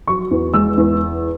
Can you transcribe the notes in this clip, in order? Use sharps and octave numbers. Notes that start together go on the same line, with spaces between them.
F#3 C#6
E2
G#3 E6
E2